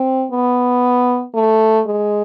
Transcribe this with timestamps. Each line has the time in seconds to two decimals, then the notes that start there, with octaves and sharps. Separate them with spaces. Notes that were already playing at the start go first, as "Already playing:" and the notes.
Already playing: C4
0.31 B3
1.35 A3
1.86 G#3